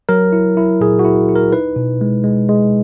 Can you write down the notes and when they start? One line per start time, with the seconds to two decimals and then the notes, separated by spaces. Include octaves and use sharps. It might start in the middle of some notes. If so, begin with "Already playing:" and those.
0.09 F#3 A#4
0.33 E4
0.57 E4
0.80 A#2 G#4
0.99 F#4
1.05 E4
1.29 E4
1.35 A#4
1.53 D#4 B4
1.76 B2
2.01 G#3
2.24 G#3
2.49 G#3